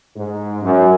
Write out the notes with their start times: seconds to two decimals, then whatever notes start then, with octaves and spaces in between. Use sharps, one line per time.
0.16 G#2
0.63 F#2